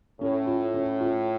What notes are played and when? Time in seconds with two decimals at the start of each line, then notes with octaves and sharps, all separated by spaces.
0.21 A2 C#4
0.47 F4
0.74 C#4
1.00 F4